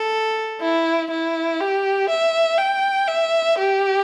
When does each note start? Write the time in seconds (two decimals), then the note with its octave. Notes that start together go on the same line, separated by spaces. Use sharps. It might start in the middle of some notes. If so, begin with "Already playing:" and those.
Already playing: A4
0.61 E4
1.10 E4
1.60 G4
2.09 E5
2.58 G5
3.08 E5
3.58 G4